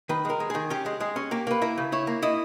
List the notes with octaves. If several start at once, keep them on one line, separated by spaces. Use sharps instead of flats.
D#3 B4
G#3 A#4
G#3
D#3 G#4
C#4 G4
G#3
G#3 G#4
C#4
A#3 G4
A#3 B4
E4 A#4
C#3
E4 C#5
A#3
E4 D#5